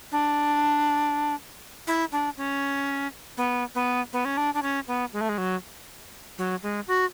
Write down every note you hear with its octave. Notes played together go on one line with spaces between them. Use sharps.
D4
E4
D4
C#4
B3
B3
B3
C#4
D4
D4
C#4
B3
G#3
A3
G#3
F#3
F#3
G#3
F#4